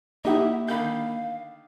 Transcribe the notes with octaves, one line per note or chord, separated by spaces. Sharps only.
A#3 D#4 E4 G4 E5 F#5 D#6
D3 D#3 F5 B5 G6